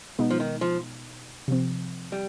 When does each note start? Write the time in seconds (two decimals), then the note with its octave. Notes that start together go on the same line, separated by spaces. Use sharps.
0.19 B2 G#3 B3 D#4
0.30 F3
0.40 D#3
0.61 F3
1.48 C3 F3 C4
2.12 G3